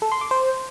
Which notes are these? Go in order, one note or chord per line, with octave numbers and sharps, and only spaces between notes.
A4
C6
D6
C5